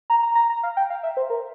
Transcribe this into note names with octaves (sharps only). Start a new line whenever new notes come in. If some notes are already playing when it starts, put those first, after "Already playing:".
A#5
A#5
A#5
A#5
F5
G5
F5
E5
C5
A#4